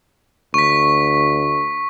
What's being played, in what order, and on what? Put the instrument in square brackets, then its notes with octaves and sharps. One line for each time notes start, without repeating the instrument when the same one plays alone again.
[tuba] D2 [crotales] C#6 B6